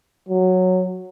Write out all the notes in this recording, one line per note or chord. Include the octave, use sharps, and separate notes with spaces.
F#3